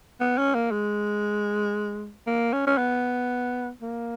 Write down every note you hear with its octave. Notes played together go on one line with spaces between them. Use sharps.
B3
C#4
A#3
G#3
A#3
C#4
C#4
B3
A#3